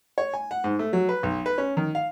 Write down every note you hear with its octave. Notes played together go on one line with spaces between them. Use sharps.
C#5
G#5
F#5
G#2
A3
F#3
B4
B1
B4
C#4
D#3
F5